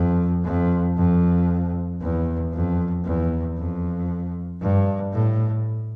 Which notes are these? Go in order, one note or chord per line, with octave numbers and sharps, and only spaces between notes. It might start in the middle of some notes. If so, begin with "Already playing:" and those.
Already playing: F2
F2
F2
E2
F2
E2
F2
G2
A2